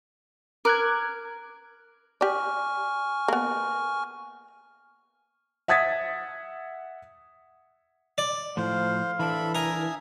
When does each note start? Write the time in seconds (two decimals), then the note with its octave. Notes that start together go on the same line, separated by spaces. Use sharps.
0.65 A#4 D6 F#6 G#6
2.21 G4 D5 G#5 C#6 F6
3.28 A#3 B3
5.68 E5 F#5 D#6 G#6 A6 B6
8.18 D5
8.57 A2 F3 C5 F5
9.19 E3 D4 A4 E5 B5
9.55 A#4 E5 G#5 D#6